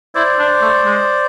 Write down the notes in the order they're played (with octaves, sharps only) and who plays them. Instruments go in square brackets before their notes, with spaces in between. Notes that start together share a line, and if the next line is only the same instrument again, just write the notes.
[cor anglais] E4 [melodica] C5 D5
[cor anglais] D4
A3
G#3